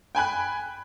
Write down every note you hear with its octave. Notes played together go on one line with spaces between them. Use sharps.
G5 G#5 B5 F#6